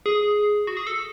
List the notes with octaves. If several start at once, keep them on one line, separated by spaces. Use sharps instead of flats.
G#4
F#4
G#4
A4